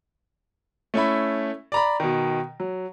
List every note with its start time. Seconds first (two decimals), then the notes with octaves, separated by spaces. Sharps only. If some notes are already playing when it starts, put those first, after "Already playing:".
0.94 A3 C#4 E4 E5 B5
1.72 D5 A#5 B5
2.00 B2 D#3
2.60 F#3